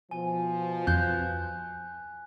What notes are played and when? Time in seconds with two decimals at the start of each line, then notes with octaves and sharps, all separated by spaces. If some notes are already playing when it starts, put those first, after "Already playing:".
0.11 B2 F3 G#5
0.87 F2 F#6 G6